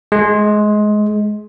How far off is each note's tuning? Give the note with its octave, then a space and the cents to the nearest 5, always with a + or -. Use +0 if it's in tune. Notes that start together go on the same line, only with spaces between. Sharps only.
G#3 +20